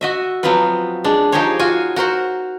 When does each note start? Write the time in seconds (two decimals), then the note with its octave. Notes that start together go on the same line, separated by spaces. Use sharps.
0.01 F#4 D#5 E5
0.43 F3 F#3 B3 C4 F4 B4
1.04 G#3 D4
1.32 F3 D#4 G4 G#4 C5 C#5
1.59 F4 F#4 G#5
1.96 F#4 A#4 C5 F#5